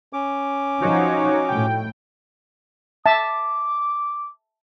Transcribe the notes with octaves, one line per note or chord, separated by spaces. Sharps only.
C#4 D6
F3 D#4 F#4 C#5
A2 G5
E5 A5 D6